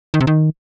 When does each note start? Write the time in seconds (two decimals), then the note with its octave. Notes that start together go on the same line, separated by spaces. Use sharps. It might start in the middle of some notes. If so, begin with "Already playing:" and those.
0.14 D#3
0.21 C3
0.27 D#3